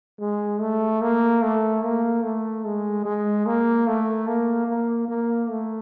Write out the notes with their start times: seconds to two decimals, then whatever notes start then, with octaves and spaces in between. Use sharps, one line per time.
0.19 G#3
0.60 A3
1.02 A#3
1.42 A3
1.83 A#3
2.23 A3
2.65 G#3
3.05 G#3
3.46 A#3
3.87 A3
4.27 A#3
4.68 A#3
5.08 A#3
5.49 A3